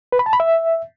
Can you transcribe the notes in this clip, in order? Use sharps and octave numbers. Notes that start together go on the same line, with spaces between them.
B4
B5
A5
B5
E5